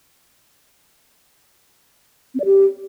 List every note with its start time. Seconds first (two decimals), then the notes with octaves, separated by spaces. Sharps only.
2.35 C4
2.40 D5
2.45 G4